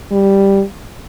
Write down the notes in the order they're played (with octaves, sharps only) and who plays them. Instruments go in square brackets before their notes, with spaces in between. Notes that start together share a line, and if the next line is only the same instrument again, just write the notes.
[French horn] G3